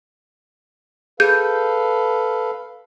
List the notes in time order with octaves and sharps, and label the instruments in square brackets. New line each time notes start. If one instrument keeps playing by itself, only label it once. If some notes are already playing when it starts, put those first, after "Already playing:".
[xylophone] G#4 G6 [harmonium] A4 B4 F5